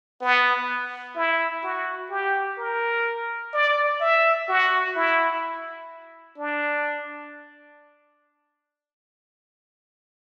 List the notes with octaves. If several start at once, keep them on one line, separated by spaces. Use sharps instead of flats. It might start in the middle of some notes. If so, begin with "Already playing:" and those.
B3
E4
F#4
G4
A#4
D5
E5
F#4
E4
D4